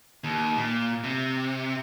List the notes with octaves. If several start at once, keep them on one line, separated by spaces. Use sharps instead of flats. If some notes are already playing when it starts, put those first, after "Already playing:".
D#2
A#2
C3